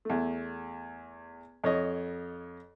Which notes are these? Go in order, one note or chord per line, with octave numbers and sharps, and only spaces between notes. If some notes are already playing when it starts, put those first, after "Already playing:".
E2 A3
F2 C#5 D#5